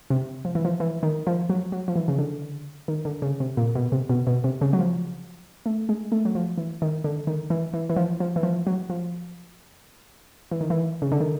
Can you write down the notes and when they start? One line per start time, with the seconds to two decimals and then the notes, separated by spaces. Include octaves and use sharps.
0.10 C3
0.45 F3
0.55 E3
0.65 F3
0.80 E3
1.03 D#3
1.27 F3
1.50 F#3
1.72 F#3
1.88 F3
1.96 E3
2.08 C#3
2.19 D3
2.88 D#3
3.05 D3
3.22 C#3
3.40 C3
3.57 A#2
3.75 B2
3.92 C3
4.10 B2
4.27 B2
4.44 C3
4.61 C#3
4.73 F#3
4.79 F3
5.66 A3
5.89 G#3
6.12 A3
6.25 F#3
6.35 F3
6.58 E3
6.82 D#3
7.04 D3
7.27 D#3
7.50 E3
7.74 E3
7.90 E3
7.96 F3
8.20 F3
8.36 E3
8.43 F3
8.67 F#3
8.90 F3
10.51 E3
10.61 D#3
10.70 E3
11.02 C#3
11.12 D3
11.20 D#3